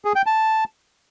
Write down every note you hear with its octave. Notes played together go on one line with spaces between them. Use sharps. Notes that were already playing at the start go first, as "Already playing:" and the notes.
G#4
G5
A5